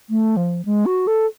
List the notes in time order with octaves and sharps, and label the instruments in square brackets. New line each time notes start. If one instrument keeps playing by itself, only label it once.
[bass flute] A3
F3
G#3
F#4
A4